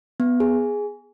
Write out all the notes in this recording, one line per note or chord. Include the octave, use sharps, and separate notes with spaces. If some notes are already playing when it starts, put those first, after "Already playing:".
B3
G#4